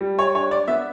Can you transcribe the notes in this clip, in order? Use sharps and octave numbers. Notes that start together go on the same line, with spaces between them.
G3
C#5
D4 C#5
D5
B3 E5